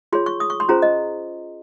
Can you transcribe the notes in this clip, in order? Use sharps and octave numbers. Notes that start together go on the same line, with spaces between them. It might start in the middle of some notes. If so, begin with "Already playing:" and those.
F4 G#4 C#5 C6
C#6
D#6
C#6
C6
C#4 F4 G#4 C5 A#5
D#5